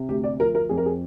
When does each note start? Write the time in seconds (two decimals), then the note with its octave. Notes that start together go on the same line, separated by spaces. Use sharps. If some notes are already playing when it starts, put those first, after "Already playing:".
Already playing: C3
0.09 D2 G4
0.24 D5
0.40 F3 A#4
0.55 A#4
0.69 F2 G#4
0.78 A#4
0.86 G#4